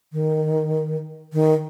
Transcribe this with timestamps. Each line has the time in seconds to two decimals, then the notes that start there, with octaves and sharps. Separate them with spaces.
0.13 D#3
1.33 D#3